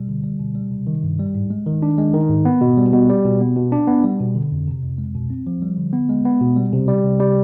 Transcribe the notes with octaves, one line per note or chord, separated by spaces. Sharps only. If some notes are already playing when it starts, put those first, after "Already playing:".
Already playing: B2 G3
D3
G3
B2
G3
C3
D#3
G2
G3
G#2
G#3
D#3
D4
G#3
D#3
G#2
B3
B2
G3
B2
G3
B2
B3
B2
D4
B3
G3
B2
D3
F2
C3
F2
G#3
B2
C4
F3
G3
D3
B3
G#3
B3
B2
G3
C3
G3
C3
G3